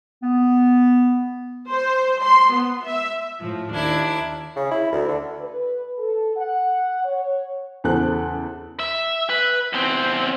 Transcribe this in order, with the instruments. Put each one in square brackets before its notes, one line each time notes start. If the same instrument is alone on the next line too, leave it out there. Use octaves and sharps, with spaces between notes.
[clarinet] B3
[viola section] C5
C6
B3
E5
[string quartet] A2 F3
D#2 D4 E4 G#6
[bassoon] C#3
E4
D2
D3
[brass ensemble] B4
A4
F#5
C#5
[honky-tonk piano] E2 C#3 A4 C5 F#6
[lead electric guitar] E5
B4
E2 C4